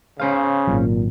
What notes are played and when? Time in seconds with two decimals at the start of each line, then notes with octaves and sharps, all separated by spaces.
0.20 C#3 C#4 C5 F5
0.67 G#1 A#2 F#3